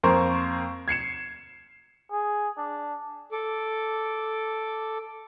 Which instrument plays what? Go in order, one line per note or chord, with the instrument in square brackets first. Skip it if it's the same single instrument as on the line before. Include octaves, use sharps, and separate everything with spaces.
[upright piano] F2 A#3 A#4 C5 C#6
G#6 C7 C#7 E7
[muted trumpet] G#4
D4
[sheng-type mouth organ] A4 D6